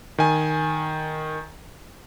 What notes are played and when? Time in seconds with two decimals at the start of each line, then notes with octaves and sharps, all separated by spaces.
0.18 D#3 G#5